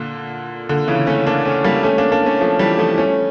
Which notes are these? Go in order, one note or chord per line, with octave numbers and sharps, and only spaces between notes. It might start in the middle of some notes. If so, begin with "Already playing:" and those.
Already playing: A#2 D3
A#2 D3
C#3 E3
A3 C#4
A#3 D4
A3 C#4
G3 A#3
A3 C#4
A#3 D4
A#3 D4
A3 C#4
F3 A3
E3 G3
F3 A3
A3 C#4